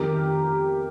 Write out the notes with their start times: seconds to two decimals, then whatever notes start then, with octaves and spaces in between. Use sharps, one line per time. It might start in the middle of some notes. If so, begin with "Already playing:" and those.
Already playing: F2 D#3 A3 G4 A#4